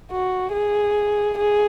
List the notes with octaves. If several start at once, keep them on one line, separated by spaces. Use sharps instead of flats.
F#4
G#4
G#4